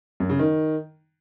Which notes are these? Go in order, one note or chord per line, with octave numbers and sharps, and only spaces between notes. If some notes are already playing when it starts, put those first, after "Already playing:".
F#2
C#3
D#3